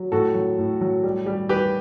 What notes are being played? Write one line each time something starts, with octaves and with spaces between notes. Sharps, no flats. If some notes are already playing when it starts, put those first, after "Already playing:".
Already playing: F#3
A2 F#4 A4
F#3
A2
F#3
G3
G3
G3 G4 B4